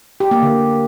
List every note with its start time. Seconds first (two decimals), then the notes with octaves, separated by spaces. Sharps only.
0.20 G4
0.31 A#3
0.42 D3